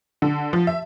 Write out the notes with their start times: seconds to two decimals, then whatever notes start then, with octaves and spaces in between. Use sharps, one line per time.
0.22 D3
0.53 F3
0.67 E5